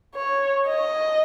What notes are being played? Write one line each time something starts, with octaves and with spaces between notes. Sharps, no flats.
C#5
D#5